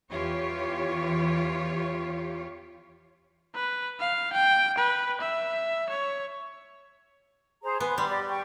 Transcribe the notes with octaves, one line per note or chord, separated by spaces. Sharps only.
E2 E3 F4 G4 C#5
B4
F5
G5
B4
E5
C#5
G#4 C5 A#5
B3 B4 G#5 C6
G3 B5 C6 D6
G4 D5 D6
G5 C#6